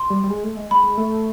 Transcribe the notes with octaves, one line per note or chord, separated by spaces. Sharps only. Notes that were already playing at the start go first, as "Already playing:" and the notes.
Already playing: C6
G3
G3
G#3
A3
G#3
G#3 B5
G#3
A3